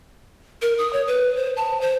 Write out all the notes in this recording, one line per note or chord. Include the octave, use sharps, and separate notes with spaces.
A#4
D#6
C#5
B4
C5
A5
C5